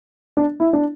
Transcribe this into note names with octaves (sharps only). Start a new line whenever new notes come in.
D4
E4
D4